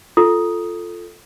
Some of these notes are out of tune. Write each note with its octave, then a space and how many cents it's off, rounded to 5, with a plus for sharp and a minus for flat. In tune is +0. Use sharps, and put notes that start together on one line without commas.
F4 +0 A4 +0 D#6 +0